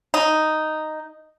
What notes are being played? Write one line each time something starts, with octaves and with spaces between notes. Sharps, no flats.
D#4